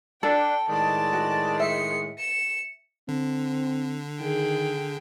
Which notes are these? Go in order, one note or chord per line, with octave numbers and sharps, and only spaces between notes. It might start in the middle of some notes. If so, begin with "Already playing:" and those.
D4 A4 G5
A2 D#3 G#3 D5 A5
F#4
E5 C7 C#7
C#7 E7
D3 C4
D#3 G#4 G5